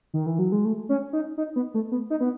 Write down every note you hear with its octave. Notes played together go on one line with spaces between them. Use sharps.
D#3
E3
F#3
G#3
A3
C#4
D#4
D#4
B3
A3
B3
D#4
B3